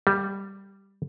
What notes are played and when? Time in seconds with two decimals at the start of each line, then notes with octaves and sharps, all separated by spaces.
0.07 G3